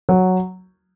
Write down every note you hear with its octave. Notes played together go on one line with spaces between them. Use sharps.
F#3